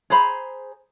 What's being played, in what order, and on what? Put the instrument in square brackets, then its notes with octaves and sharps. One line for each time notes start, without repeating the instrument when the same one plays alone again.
[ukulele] G#4 C5 A#5 B5